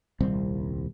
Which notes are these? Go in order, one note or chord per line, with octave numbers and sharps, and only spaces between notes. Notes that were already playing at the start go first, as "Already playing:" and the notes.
D#1 C2 C4